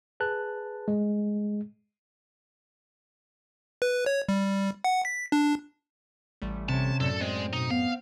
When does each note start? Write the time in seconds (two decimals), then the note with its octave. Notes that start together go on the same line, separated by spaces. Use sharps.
0.20 G#4 B4 A5 F#6
0.88 G#3
3.82 B4
4.06 C#5
4.29 G3
4.84 F#5
5.05 B6
5.32 D4
6.42 A1 G3 A3
6.69 C3 C#4 A5
7.00 F#2 A2 A4 D5
7.21 G#3 C4
7.53 B2 D#4
7.71 B3 F5